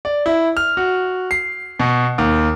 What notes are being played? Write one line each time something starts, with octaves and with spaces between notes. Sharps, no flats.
D5
E4
F6
F#4
C7
B2
D#2